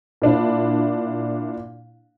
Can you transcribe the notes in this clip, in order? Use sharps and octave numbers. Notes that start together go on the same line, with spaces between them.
A#2 D4 E4